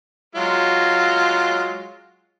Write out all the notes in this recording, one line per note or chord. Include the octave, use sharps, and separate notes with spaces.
F#3 G#3 F4